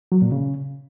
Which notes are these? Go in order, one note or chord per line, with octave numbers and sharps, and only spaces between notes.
F#3
A#2
C#3